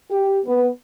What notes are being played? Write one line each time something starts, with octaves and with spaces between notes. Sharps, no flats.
G4
B3